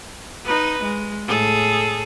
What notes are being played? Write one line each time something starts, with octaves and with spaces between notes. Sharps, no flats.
D#4 B4
G#3
A2 G#4 A4